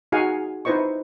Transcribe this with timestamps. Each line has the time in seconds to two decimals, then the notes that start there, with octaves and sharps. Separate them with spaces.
0.12 D#4 F#4 G#4 F5 F#5 G#5
0.65 D#4 E4 B4 C5 D#5 C#6